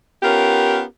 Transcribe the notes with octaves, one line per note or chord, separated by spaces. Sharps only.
B3 C#4 F4 G4 A#4